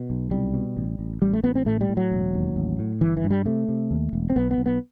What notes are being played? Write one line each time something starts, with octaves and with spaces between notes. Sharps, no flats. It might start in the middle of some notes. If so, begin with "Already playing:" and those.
Already playing: B2
B1
C2 G3
B2
A1
A1
A1 G3
A3
A1 B3
C4
A2 A3
G3
A2
F#3
E1
D#2
A1
A2
G1 E3
E3
G2
G3
C3 A3
C3
D#2
E1
C4
B1 B3
B3
B1
B3